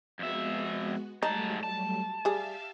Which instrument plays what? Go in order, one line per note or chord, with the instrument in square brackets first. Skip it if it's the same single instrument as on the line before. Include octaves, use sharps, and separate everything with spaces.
[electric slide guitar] F2 E5 [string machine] G#3 B3 F#4
[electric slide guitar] G#2 A5 [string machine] F#3 G3 A3 [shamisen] D#4
[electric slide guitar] A5
[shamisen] G3 G#4 [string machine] G4 E5 F5